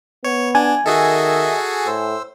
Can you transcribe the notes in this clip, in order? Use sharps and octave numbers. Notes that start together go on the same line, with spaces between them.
B3 C#5
D4 G#5
D#3 F#4 G#4 A4 D#5 E5
A2 C5 E6